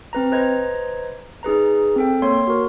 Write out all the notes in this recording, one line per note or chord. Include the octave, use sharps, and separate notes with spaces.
C4 B4 A#5
B4 C5 D#5 A#5 G#6
D#4 G#4 B4 A#5
C4 A4 G5
A#3 C#5 C6
F#4 A#4